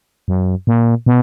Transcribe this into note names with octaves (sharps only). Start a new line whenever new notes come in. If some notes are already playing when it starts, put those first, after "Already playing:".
F#2
A#2
B2